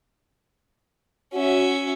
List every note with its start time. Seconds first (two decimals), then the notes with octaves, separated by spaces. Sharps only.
1.34 C#4 F#4 E5